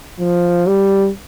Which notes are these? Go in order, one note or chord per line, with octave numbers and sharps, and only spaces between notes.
F3
G3